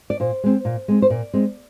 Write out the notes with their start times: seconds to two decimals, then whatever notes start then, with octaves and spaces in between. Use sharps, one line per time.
0.10 D5
0.20 A#2 C5
0.44 G#3 C4
0.65 A#2
0.88 G#3 C4
1.02 C5
1.10 A#2 D5
1.33 G#3 C4